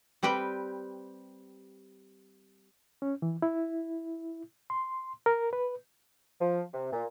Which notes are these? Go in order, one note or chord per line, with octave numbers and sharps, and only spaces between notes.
G3 C4 G4 B4 G5
C#4
E3
E4
C6
A#4
B4
F3
C3
A#2